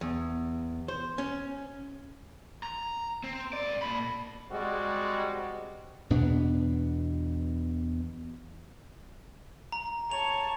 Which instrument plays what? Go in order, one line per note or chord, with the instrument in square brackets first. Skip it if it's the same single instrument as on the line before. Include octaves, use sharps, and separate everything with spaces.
[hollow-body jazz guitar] E2
C5
C#4
[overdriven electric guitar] A#5
C4
G#2 D5
A#2 B5
[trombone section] G3 G#3 C4 F#4
[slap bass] E2 B2 B3 D4
[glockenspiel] A#5
[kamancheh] C#5 A5 [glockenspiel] F7